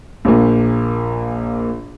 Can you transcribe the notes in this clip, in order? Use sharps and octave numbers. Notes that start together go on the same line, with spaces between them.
A#1 A#2